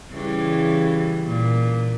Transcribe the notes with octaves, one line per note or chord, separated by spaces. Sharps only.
C#3 E3 G3
A#2